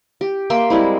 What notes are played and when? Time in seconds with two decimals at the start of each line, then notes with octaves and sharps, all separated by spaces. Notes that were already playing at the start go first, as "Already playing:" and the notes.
0.21 G4
0.50 A#3 E5 G5 C6
0.70 G3 G#3 C4 E4